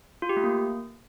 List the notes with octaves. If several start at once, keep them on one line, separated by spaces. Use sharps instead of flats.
F4
G4
A3
A#3